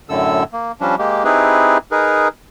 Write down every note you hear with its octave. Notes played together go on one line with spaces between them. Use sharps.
F#2 A2 D3 A4 E6
A#3
F3 G3 C#4 D4
G#3 A#3 G4
C4 D#4 E4 G4 G#4 B4
D#4 G#4 A#4 B4